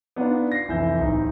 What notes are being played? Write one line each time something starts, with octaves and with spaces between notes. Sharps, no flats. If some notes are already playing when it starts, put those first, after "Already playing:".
B3 D4 D#4 F4
A#6 C7
F1 E3 E4 E5 G6
D1 D#4